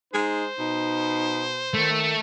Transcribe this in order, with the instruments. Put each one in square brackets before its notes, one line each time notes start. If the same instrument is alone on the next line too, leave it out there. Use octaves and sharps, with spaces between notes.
[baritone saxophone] G#3 [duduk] D#4 [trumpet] C5
[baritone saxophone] B2 [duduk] D#4
[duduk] D#3 [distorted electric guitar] A3